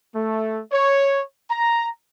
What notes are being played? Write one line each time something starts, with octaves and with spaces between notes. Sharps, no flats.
A3
C#5
A#5